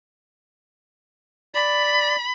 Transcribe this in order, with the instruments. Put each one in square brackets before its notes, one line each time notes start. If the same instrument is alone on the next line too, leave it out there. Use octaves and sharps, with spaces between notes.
[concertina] D5 [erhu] B5